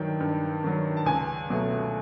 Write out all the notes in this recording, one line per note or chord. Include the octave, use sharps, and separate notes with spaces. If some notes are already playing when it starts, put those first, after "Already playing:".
Already playing: G2 D#3 F#3 G5
G2
D#3 F#3
A5
C#2 G#5
B2 F#3 A3